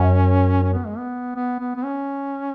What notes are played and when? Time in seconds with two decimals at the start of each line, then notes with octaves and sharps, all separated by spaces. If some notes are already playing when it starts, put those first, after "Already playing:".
Already playing: F#2 C#4
0.63 C#4
0.74 B3
0.86 G#3
0.98 B3
1.36 B3
1.60 B3
1.76 B3
1.85 C#4